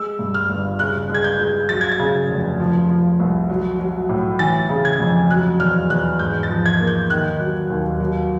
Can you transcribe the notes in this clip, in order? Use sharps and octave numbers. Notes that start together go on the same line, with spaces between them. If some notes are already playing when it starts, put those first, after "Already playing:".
Already playing: G#3 E6
G2
F6
G1
C#3 F#6
G#3
G#6
G6
G#3
F#3 A6
G#6
A6
C#3
F1
F3
F3
C2
F#3
F#3
A2
E3 A6
C#3
G#6
F2
F#3 F#6
E2 F6
E2 F#6
G#2 G6
A6
F3
G#6
A#3
G6
D#3 F#6
F#3
D#2
F#3